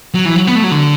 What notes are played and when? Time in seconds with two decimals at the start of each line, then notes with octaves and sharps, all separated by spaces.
0.14 F#3
0.25 E3
0.36 F#3
0.47 B3
0.56 A3
0.64 F#3
0.71 D3